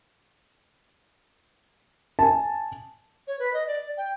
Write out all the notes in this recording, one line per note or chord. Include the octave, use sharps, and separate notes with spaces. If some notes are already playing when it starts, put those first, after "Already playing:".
G#5 A5
C#5
B4
D#5
D5
G5